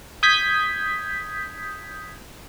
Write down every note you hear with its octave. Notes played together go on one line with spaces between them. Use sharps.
D#6 G6 G#6 B6